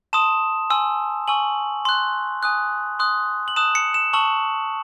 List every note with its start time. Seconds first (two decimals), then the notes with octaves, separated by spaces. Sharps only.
0.13 A5 C6 D#6 E7
0.70 G#5 C6 E6
1.28 G#5 C#6 E6 F#7
1.85 C6 F#6
2.43 G#5 D#6 F#6
2.99 C6 D#6 F#6
3.48 F#7
3.56 A5 D#6 F#6 E7
3.75 C#7
3.94 E7
4.13 A5 C#6 E6 F#7